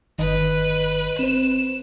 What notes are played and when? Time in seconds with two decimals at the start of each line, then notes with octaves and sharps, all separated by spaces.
0.19 G1 D#3 B4 D#5
1.19 C4 C5 E7